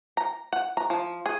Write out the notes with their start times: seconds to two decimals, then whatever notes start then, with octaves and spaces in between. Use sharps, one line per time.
0.17 A#5
0.53 F#5
0.77 A#5
0.90 F3
1.26 G#4